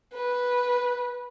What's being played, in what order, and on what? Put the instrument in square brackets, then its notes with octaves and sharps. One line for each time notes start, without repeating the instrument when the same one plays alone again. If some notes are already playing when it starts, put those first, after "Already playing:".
[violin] B4